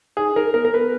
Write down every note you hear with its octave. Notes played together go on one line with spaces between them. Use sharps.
D#4 G#4
D#4 A#4
B3 A#4
A#4
B3 B4